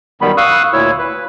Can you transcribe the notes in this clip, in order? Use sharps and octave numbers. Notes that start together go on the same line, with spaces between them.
F#2 D#3 G3 B3 B5
F5 C#6 D#6 E6 F#6
D2 A#2 E4 C#5 E6
B4